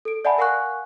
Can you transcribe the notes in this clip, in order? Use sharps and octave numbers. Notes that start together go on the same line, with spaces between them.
A4 D7
D5 E5 F#5 G#5 A5 B5
A#4 F5 F#5 G#5 C#6 F#6